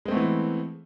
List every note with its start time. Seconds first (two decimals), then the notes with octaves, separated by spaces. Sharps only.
0.05 G#3
0.08 C4
0.11 A3
0.14 B3
0.17 E3